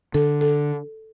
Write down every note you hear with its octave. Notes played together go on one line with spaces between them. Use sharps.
D3 A4
A4